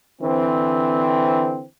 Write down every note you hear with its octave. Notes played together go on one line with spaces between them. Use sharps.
D3 E3 C4